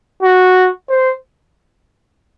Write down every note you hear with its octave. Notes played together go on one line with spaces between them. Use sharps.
F#4
C5